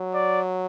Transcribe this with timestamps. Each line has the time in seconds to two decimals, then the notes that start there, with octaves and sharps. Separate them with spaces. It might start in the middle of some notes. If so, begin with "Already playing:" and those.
Already playing: F#3
0.14 D5